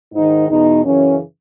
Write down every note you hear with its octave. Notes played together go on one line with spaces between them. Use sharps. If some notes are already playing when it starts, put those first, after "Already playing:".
G#2 D#3 D#4
E2 B2 D#4
F#2 C#3 E3 C#4